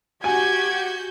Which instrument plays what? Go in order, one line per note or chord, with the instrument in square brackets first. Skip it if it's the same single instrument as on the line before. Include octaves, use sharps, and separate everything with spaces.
[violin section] F#4 G6 [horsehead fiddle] G4 [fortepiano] G#5 [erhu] G#6